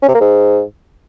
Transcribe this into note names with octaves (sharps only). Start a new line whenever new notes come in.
C#4
C3
A#3
G#2